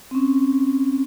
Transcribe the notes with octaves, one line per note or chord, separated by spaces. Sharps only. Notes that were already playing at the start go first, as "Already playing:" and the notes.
C4
C#4